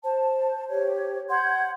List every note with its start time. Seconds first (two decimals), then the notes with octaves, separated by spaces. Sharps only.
0.04 C5 A5
0.69 G4 C#5
1.30 F#5 C6 G6 G#6